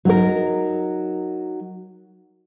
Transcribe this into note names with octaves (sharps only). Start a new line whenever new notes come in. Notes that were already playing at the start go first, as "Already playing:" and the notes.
F#3 D#4 A#4